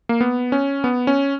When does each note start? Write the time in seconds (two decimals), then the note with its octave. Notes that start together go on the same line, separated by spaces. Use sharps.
0.09 A#3
0.21 B3
0.52 C#4
0.84 B3
1.07 C#4